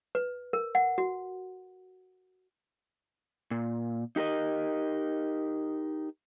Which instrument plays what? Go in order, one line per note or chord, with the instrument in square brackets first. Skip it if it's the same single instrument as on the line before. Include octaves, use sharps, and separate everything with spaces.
[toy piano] B4
A#4
F#5
F#4
[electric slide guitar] A#2
D#4 G4 A#4 D#5